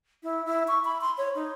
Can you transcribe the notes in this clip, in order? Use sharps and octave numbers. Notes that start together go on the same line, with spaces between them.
E4
E4
C#6
B5
C6
C#5
D#4